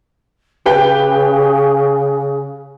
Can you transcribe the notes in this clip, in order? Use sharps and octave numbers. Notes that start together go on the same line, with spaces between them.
C#3 G4 B4 G5